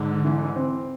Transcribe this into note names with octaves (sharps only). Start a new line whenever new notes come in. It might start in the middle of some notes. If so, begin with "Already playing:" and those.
Already playing: G#2 D3
E3
C4